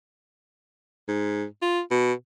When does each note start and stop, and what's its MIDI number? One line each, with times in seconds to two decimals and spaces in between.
1.09 1.45 44
1.62 1.80 65
1.91 2.13 47